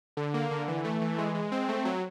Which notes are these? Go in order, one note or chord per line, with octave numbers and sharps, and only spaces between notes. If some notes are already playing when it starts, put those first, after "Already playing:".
D3
A#3
D3
E3
A3
E3
G#3
G#3
C4
A3
F#3